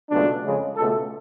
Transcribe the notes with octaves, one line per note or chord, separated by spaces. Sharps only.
C#2 B2 F#3 A3 D4
F2 C#3 G#3
C#2 B2 A3 A4